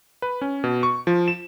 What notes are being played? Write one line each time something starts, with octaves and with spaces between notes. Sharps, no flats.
B4
C#4
B2
C#6
F3
E7